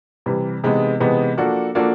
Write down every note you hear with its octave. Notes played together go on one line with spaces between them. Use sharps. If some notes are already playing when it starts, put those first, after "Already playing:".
C3 E3 G3
C3 E3 G#3 B3 D#4
C3 E3 G#3 B3 D#4
F3 A#3 D4 F#4 A4
F3 A#3 D4 F#4 A4